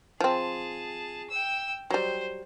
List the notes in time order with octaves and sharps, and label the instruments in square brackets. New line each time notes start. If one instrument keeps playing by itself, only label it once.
[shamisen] F3 C4 [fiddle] G#4 A5
[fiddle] G5 E6
[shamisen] F#3 G3 [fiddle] C5